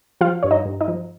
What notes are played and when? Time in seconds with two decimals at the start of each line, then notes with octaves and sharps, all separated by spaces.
0.21 F3 F4 F5
0.43 G2 C#5
0.51 D#4 D#5
0.66 G2
0.81 D#4 D#5
0.88 F3